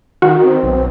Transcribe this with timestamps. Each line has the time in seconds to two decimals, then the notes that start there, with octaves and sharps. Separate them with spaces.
0.22 D#3 F#4
0.43 C4
0.63 B1